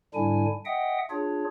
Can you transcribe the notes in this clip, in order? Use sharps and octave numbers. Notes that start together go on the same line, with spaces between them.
G#2 D3 G3 D4 E4 G#5
D#5 E5 F#5 G5 D#6
D4 F4 G#4 C#5